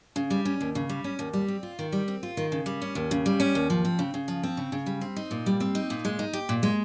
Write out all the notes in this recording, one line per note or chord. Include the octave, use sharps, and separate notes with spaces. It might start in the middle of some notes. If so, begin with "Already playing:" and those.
C#3
G3
C#4
D#2
C#3
G3
C#4
D#2
G3
C4
F4
D#3
G3
C4
F4
D#3
C#3
G3
C#4
D#2
C#3
G3
C#4
D#2
F3
C4
C#3
C#3
F3
C4
C#3
C#3
G3
C4
D#4
A#2
G3
C4
D#4
A#2
G#3
D#4
G4
A#2
G#3